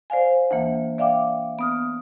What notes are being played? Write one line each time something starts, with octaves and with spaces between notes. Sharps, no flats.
C5 D5 F5 G#5
D2 E3 A#3
D5 E5 F5 G5 D6
B3 D#6 F6